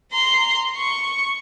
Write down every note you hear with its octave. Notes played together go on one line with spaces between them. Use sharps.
A#5 C6
C#6